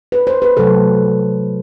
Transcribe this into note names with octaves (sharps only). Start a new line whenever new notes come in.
B4
C5
B4
C3 F#3 A3 A4